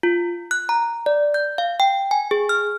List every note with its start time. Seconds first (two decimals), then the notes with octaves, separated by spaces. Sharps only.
0.03 F4
0.51 F#6
0.69 A#5
1.06 D5
1.34 G6
1.58 F5
1.80 G5
2.11 G#5
2.31 G#4
2.49 F6